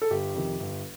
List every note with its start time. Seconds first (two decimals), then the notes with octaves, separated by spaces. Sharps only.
0.02 A4
0.10 G1 G4
0.34 F2 C3 D#3
0.60 G1